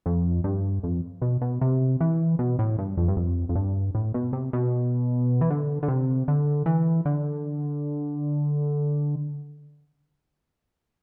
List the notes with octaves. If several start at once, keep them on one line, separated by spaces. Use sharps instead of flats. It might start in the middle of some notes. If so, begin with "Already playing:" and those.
F2
G2
F2
B2
B2
C3
E3
B2
A2
G2
F2
G2
F2
F2
G2
A2
B2
C3
B2
E3
D3
D3
C3
D3
E3
D3